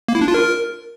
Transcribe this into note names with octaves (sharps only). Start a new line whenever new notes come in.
A#3
E4
D4
F4
A#4